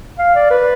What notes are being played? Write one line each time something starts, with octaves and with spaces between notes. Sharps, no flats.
F5
D5
B4